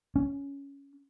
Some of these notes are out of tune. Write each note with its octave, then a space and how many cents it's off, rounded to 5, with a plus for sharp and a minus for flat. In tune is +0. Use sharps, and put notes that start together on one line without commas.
C#4 +10